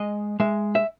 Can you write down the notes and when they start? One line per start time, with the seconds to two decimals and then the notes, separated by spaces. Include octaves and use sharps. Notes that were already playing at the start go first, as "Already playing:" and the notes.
Already playing: G#3 D#5
0.40 G#3 E5
0.75 E5